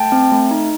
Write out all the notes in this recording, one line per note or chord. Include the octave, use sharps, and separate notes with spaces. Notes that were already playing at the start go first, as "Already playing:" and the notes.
Already playing: A3 G5 A5
C4
A3
D#4